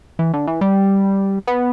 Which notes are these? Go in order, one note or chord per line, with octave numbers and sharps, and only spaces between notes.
E3
D3
E3
G3
B3